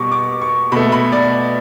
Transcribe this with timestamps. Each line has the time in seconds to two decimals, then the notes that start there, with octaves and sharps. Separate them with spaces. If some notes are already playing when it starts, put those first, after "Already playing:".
Already playing: B2 G3 C#6 D6
0.12 D6
0.42 C#6
0.72 B2 A3 B5
0.92 B5
1.12 D5